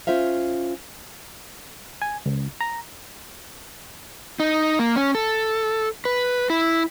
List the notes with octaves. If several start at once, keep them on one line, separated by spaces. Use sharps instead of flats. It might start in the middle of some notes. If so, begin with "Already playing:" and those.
C#4 F4 C5 E5 F5
G#5
C#2
A#5
D#4
A#3
C#4
A4
B4
E4